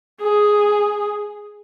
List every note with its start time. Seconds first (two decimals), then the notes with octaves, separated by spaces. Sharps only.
0.21 G#4